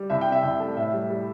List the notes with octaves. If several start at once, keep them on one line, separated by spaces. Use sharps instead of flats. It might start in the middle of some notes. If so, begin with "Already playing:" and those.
Already playing: G3
C2 E5
G5
C3
E5
C2 E5
A3
A2 E5
G3
G3